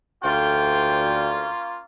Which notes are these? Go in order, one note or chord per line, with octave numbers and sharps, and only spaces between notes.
D2 A#3 C#4 F4 G5